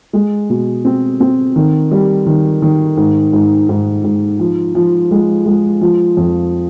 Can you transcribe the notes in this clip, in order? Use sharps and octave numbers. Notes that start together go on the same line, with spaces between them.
G#3
B2
C4
C4
D#3
G3
D#3
D#3
G#2
G#2
G#2
G#2
F3
F3
G#3
G#3
F3
F2